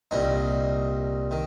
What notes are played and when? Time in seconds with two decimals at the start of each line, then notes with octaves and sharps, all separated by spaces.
0.11 C2 A#2 G3 D#4
1.31 D#3